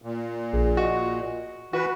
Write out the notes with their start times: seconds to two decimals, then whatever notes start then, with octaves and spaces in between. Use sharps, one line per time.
0.02 A#2
0.53 A#1 G#4
0.77 F#4 D#5
1.73 E3 F#4 B4